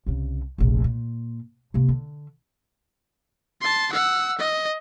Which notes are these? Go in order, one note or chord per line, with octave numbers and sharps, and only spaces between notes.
C2 C#3
F1 A#1
A#2
C3 A#3
D3
A5 C6
F#5 E6
D#5